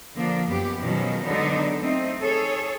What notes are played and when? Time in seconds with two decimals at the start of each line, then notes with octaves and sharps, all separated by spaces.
0.15 D3 F3 A#3 D4
0.48 F#2 B3 G4
0.81 B2 D#3 F3 F#3 G#3 C#4
1.24 D3 F#3 G#3 B3 D4 D#4
1.80 A3 C4 D#4
2.21 G#4 A4 C#5